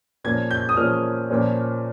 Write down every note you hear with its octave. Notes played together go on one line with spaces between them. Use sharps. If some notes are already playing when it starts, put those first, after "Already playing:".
A#2 F3 A#3 C#4 G#6
G6
D#6
A#2 F3 A#3 C#4 F6
A#2 F3 A#3 C#4